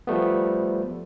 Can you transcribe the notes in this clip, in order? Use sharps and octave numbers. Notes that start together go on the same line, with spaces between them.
F3 G3 A3 B3